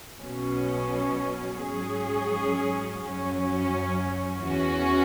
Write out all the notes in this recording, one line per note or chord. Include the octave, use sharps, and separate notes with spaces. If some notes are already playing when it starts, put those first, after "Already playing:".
B1 B2 F#3 C#4
G#2 F#3 C#4 G#4
F#2 F#3 C#4
E2 E3 C#4 F#4